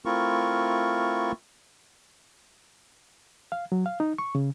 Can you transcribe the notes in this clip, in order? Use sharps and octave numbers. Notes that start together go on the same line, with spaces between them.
A3 C4 E4 F4 A#4 C#6
F5
F#3
F5
D#4
C#6
C#3